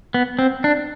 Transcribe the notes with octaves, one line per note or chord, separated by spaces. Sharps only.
B3
C4
D4